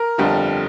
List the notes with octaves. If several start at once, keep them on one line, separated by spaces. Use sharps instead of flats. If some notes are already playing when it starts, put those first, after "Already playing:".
Already playing: A#4
G1 F2 D3 G3